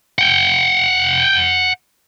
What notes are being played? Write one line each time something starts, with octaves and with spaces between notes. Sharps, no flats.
F#5 G5